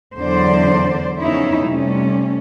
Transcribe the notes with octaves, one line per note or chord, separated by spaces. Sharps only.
E2 D3 F#3 C5 D5
F2 C#3 B3 C#4 D#4 E4
C3 G3 A3 C#4